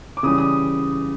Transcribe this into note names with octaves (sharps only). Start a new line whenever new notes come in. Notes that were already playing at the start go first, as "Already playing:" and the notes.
D6
C#3 E3 G3 D#6
D#6